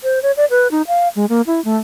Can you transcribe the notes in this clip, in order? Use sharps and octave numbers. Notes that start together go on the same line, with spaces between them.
C5
C#5
D5
B4
D#4
F5
G#3
A#3
E4
A3